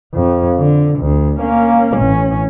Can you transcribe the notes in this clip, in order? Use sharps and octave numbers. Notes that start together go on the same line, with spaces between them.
F2
D3
D2
A#3 C#4
A1 C#4